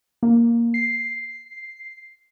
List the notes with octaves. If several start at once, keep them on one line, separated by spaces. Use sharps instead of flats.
A#3
C7